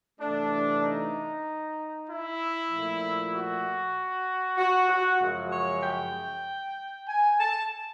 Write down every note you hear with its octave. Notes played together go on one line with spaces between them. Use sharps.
C3 E3 A3 D4
D#4
E4
A#2 F3 A3
F#4
F#4
F#4
F#2 C#3 F3 G#3
C#5
G5
G#5
A5